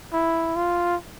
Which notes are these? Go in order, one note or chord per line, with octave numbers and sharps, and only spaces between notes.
E4
F4